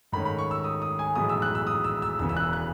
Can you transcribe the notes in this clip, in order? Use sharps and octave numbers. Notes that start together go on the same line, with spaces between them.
G#2 D#3 A3 C#4 B5
B5
C#6
E6
D#6
D#6
G#5
B1 A2 E3 G#3 B3 D#6
E6
F#6
E6
D#6
E6
E6
E1 E2 C#3 E3 B3 E6
E6
F#6
F#6